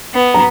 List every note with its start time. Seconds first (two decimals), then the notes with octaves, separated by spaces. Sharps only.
0.14 B3
0.34 A#5